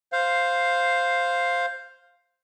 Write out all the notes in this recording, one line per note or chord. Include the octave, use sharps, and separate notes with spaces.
C5 F5